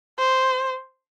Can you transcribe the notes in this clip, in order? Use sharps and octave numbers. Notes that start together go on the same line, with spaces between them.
C5